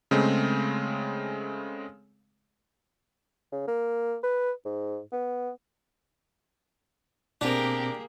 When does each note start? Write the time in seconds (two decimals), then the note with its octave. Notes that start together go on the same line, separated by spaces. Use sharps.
0.11 C#3 G#3 A3 C4
3.52 C#3
3.68 A#3
4.23 B4
4.65 G#2
5.12 B3
7.41 B2 A#3 C4 D4 G4 G#4 A#4